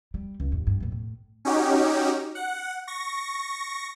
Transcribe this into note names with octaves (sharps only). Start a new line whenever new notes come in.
G3
C#2
D#2 G#2
G2
E2 A2
A2
C#4 D#4 F#4 G4
F#5
C#6 A#6